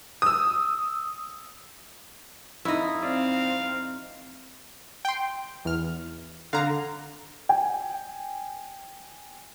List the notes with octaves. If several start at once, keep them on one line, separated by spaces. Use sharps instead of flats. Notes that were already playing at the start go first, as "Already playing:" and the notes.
D#6 E6
F2 D#4 E4
C4 D5 F5
G5 C6
E2 F6
D3 F5 A#5
G5 G#5